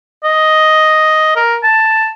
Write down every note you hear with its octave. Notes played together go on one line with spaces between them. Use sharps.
D#5
A#4
A5